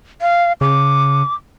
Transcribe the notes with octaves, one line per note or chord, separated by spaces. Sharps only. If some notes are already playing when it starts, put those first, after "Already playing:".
F5
C#3 D6